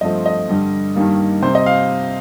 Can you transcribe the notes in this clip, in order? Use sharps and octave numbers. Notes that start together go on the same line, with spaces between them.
G2 F3 A3 C4 D#5
D#5
G2 D3 G3
G2 D#3 G3 A#3
C3 G3 C4 C5
D#5
F5